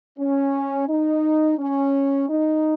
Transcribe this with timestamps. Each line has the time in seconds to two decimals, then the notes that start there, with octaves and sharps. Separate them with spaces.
0.19 C#4
0.88 D#4
1.58 C#4
2.29 D#4